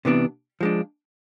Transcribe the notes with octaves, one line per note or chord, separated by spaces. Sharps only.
C3 E3 B3 D4
F3 G#3 D4